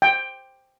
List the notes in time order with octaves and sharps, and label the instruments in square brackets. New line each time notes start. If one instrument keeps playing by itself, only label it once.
[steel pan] G5